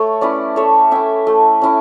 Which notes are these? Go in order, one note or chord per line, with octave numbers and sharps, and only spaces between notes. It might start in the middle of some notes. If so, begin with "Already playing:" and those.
Already playing: A3 A4 C#5
C#4 E4 B4 D5
A3 C#5 E5
C#4 E4 E5 G5
A3
C#4 E4